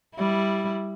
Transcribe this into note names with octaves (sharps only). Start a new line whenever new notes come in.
G3 E4